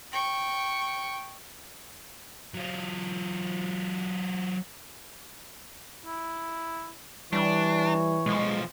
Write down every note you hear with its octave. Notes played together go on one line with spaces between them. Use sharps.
G5 C#6
F#3 F4
E4
E3 G3 D4 C#5
B1 F3 G#3